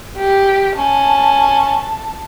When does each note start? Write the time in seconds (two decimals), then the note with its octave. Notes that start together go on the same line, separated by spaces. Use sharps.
0.18 G4
0.77 C#4 A5